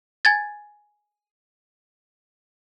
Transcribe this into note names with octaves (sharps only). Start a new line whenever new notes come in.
G#5 G#6 A6